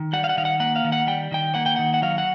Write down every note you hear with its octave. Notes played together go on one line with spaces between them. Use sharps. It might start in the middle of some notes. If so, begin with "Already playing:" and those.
Already playing: D#3
G3 F#5
F5
F#5
D#3 F5
F#5
A#3 F#5
F5
D#3
F#5
G3 G5
D#3 G5
A#3 F#5
G5
D#3 F#5
F#5
F#3 F5
F#5